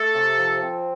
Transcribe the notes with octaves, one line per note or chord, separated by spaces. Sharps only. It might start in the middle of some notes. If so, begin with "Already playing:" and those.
Already playing: A3 A4
C3
F3
C4